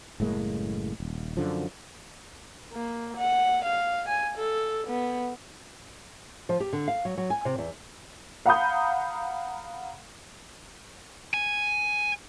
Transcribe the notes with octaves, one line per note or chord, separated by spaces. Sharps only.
F#1 A2 G#3 A#3
D#1
F#2 D3 F3
A#3
F#5
F5
G#5
A4
B3
F3
G4
D3
F5
F#3
F#3
G#5
C3
E2
F5 F#5 A#5 B5 D#6 G6
G#5